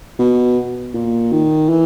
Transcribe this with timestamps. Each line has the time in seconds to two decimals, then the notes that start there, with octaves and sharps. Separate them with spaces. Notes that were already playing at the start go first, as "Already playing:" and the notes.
0.19 B2
0.94 A#2
1.32 D#3
1.69 E3